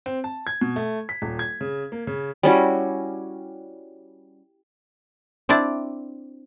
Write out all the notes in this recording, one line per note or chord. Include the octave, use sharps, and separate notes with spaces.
C4
A5
G#6
B2
A3
B6
D#1
G#6
C#3
A#3
C#3
G3 C#4 E4 F#4
C4 D4 E4 D5